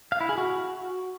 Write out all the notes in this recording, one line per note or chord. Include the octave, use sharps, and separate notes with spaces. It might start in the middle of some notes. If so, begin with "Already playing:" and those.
F5
E4
G#4
F#4